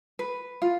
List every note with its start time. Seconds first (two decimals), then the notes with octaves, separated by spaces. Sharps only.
0.19 B4
0.62 F4